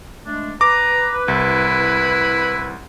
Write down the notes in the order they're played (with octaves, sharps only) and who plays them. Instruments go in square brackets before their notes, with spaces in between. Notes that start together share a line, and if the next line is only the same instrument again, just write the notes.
[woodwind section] G#3 A3 D4
[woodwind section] B4 [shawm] A#5 [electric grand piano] D6
[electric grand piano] C2 [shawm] E4